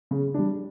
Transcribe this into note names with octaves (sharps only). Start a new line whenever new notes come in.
C#3
G3 D4